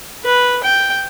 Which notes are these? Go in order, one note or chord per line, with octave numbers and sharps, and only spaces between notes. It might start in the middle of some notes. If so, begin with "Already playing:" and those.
B4
G5